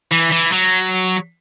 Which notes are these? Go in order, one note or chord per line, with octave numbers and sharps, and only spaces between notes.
E3
E3
F#3